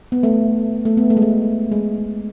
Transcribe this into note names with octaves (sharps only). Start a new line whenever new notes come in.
B3
A3
A3
B3
A3
G#3
A3
G#3